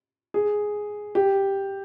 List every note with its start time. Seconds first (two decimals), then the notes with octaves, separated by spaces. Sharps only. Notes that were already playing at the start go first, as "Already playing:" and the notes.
0.34 G#4
1.15 G4